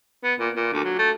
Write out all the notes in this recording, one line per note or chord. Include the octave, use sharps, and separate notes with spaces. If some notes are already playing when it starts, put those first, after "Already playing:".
B3
A#2
A#2
D2
F#3
A3